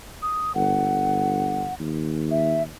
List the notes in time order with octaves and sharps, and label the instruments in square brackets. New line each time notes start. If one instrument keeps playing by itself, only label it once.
[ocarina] D#6
[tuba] G1 [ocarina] F#5
[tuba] D#2
[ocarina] E5